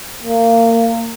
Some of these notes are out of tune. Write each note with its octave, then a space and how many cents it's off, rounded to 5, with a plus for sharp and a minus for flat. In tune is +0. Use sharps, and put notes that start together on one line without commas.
A#3 -25